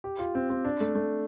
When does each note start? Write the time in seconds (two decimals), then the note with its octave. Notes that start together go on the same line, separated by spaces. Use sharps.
0.04 G4
0.19 F4
0.35 C4
0.50 C4
0.65 D4
0.80 A3
0.95 A3